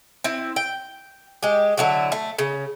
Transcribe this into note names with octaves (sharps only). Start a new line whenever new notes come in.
C4 E4
G5
G#3 G4
D3 F#3 E4 F#4
A3
C#3